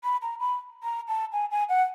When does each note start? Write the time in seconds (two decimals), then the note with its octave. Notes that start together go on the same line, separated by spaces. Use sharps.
0.04 B5
0.22 A#5
0.40 B5
0.83 A#5
1.08 A5
1.32 G#5
1.51 G#5
1.69 F#5